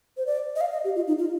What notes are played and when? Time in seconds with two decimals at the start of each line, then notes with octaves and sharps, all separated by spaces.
0.17 C5
0.26 D5
0.56 D#5
0.61 F5
0.73 D#5
0.84 G4
0.96 F4
1.07 D#4
1.19 F4